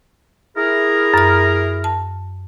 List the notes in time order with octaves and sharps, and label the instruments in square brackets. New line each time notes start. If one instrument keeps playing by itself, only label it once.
[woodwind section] E4 G#4 A#4
[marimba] F#2 F6
A5